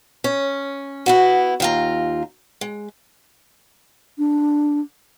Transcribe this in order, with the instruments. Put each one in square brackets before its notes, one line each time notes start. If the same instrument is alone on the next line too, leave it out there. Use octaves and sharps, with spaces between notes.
[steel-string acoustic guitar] C#4
B3 E4 F#4
D#2 F4 A#5
G#3
[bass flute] D4